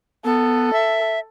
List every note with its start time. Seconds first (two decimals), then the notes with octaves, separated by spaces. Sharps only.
0.25 B3 A4
0.73 E5